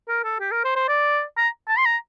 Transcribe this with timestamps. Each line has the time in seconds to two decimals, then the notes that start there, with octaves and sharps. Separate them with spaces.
0.08 A#4
0.24 A4
0.40 G4
0.52 A#4
0.64 C5
0.76 C5
0.88 D5
1.37 A#5
1.69 A5
1.78 C6
1.86 A#5